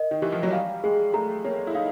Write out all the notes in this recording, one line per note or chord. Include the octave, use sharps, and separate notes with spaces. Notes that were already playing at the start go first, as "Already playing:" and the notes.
Already playing: A#4 D#5
D#3
E3 G4
F3
F#3
G3 F5
G#3 G#4
A3 A#5
A#3 C#5
E4
D#4 F5